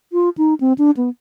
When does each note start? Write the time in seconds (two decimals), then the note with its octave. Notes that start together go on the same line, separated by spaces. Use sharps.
0.13 F4
0.38 D#4
0.60 C4
0.78 D4
0.97 B3